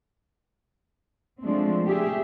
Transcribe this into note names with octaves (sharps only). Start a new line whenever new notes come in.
F3 G#3 A3 C4 D4
A3 G4 G#4 E5